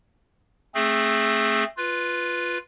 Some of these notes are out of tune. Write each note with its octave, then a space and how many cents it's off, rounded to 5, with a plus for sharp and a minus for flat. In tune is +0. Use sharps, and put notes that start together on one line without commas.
A3 +0 C4 +25 G#4 +5
F4 +0 B4 +0